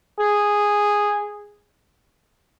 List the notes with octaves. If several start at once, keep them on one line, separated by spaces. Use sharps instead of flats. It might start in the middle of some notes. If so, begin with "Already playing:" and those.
G#4